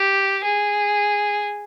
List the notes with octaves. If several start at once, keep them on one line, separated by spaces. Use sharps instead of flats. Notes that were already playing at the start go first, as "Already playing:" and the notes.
Already playing: G4
G#4